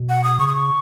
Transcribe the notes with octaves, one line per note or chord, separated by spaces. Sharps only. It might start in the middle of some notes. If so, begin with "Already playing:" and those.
Already playing: B2
F#5
D#6
C#3 C#6
D#6
C#6